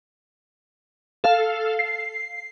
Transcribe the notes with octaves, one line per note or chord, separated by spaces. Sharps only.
A4 F5
C7